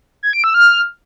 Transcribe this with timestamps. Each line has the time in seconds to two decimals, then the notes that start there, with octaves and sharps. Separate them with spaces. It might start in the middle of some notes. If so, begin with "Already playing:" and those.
0.23 G#6
0.33 D7
0.44 E6
0.54 F6